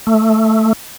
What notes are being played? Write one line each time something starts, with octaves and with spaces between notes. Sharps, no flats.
A3